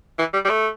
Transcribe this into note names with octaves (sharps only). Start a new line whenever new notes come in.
E3
G3
G3
A3